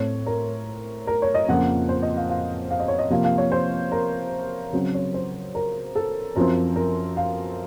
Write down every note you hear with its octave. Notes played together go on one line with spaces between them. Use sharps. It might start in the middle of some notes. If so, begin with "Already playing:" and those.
Already playing: A2 A3 C4 C#5
A#4
A#4
C#5
D#5
F2 C#3 F3 A#3 F#5
C5
D#5
F5
F5
F5
D#5
C#5
D#5
C3 F3 A#3 F5
F5
C#5
C5
A#4
C#3 F#3 C4
C#5
C5
A#4
A4
F#2 F3 C4 A#4
A#4
F5